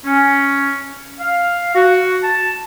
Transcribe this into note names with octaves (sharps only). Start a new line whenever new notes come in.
C#4
F5
F#4
A5